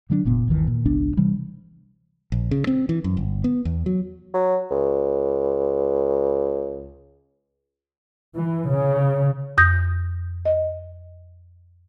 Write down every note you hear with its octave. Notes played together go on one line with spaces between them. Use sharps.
D3 F#3 A3 D4
F1 A#2 B3
G1 D#2 D#3 E3
A#2
G#1 C#2 B3 D4
C3 E3 G3
A#1
C#3
C4
E3
F#2
G1
B3
E2
F#3
F#3
C#2
E3
C#3
F2 D#6 G6 A#6
D#5